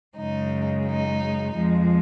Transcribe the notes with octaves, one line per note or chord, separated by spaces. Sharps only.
F#2 C#3 G#3 D#4
D#4
F2 F3 G#3